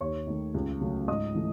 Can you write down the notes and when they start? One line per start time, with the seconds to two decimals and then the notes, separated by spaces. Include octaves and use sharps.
0.01 D#2 C#5 C#6
0.27 D#3 A3
0.54 C#2
0.81 C#3 F#3 A3
1.08 G#2 D#5 D#6
1.35 E3 A3